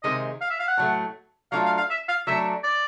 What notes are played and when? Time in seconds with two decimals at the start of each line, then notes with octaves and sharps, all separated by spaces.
0.03 C3 D#3 G#3 D#5
0.41 F5
0.50 E5
0.60 F5
0.68 F#5
0.77 A2 F#3 A3
1.52 F#3 A3 D4 F4 F5
1.65 F5
1.78 F5
1.90 E5
2.09 F5
2.27 F#3 A3 D4 E5
2.64 D5